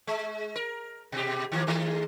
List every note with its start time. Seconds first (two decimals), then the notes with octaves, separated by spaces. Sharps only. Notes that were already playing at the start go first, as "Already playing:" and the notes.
0.07 G#3
0.56 A#4
1.12 B2 G4
1.52 D#3 F3 A#3
1.67 D#3 G#3 A3